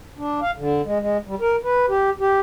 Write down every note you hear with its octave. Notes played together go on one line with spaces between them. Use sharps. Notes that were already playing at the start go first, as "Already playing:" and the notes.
D4
F5
D3
G#3
G#3
G3
A#4
B4
G4
G4